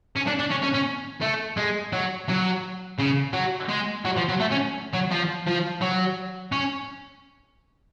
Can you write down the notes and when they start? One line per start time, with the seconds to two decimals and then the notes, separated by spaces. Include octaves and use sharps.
0.16 C#4
0.27 D4
0.39 D4
0.51 C#4
0.63 C#4
0.74 C#4
1.22 A3
1.57 G#3
1.93 F#3
2.28 F#3
2.99 C#3
3.33 F#3
3.69 G#3
4.05 F#3
4.17 F3
4.29 F#3
4.40 A3
4.52 C#4
4.93 F#3
5.11 F3
5.47 F3
5.81 F#3
6.52 C#4